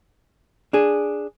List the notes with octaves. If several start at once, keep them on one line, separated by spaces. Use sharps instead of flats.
D4 G#4